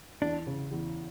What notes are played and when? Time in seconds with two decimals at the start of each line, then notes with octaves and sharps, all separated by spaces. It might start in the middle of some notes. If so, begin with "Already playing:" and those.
0.21 E2 D4
0.47 C#3
0.71 E2